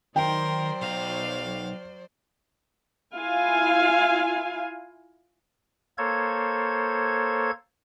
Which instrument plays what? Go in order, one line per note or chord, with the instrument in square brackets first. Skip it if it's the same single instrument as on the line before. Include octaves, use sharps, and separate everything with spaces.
[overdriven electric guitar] D#3 [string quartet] F#3 C5 D5 [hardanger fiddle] A#4 C6 [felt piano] G5
[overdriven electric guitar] B1 A#5 [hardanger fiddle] F5
[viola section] E4 F4 F5 G#5
[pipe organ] A#3 A4 C5 C#5 G#6